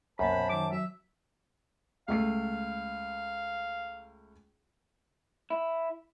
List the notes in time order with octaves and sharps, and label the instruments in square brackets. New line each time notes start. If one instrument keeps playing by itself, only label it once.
[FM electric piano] C2 A#3 [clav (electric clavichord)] F#2 [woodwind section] C5 A5 [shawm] B5
[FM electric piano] B2 F#5 G5
[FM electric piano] D#3 F#3 [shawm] D6
[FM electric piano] F#3 [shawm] E5
[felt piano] C#2 A3 C7 [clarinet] F5
[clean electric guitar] E4